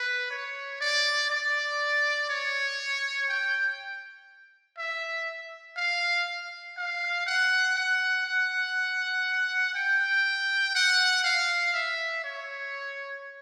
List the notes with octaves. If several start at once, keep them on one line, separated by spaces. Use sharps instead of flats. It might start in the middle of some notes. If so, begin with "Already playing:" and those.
Already playing: B4
C#5
D5
D5
C#5
G5
E5
F5
F5
F#5
F#5
F#5
G5
F#5
F5
E5
C#5